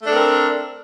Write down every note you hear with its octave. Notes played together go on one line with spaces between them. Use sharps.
A3 C4 D4 A4 A#4